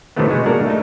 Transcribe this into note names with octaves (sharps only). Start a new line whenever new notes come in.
C3 D#3 E3 F#3 A3 B3
B2 G#3 F#4
G#3 A#3 D4 F#4 A#4
A3 D#4